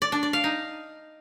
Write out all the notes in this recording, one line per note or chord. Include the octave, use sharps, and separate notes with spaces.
D5
D4
D5
F5
D#4